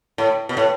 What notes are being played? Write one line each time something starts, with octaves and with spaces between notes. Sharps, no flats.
A2
B2
A2